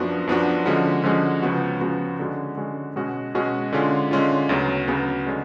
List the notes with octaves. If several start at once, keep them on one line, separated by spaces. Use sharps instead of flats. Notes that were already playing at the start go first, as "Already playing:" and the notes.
Already playing: F#2 F3 B3 D4 F#4
F#2 F3 B3 D4 F#4
D3 F3 G#3 C#4 F#4
D3 F3 G#3 C#4 F#4
C#2 C#3 F3 B3 F#4
C#2 C#3 F3 B3 F#4
D3 G#3 C#4 F#4
D3 G#3 C#4 F#4
B2 G#3 C#4 F#4
B2 G#3 C#4 F#4
D3 G#3 C#4 F4
D3 G#3 C#4 F4
D2 C#3 F#3 B3
D2 C#3 F#3 B3
D3 G#3 C#4